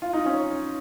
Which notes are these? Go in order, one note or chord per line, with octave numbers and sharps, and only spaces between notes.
F4
D#4
C#4